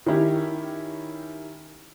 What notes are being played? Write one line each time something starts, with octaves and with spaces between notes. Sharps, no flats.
D#3 C#4 E4 G4